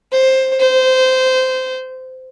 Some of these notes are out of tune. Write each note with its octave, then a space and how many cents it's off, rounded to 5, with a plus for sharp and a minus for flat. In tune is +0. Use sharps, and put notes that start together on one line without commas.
C5 +10
C5 -20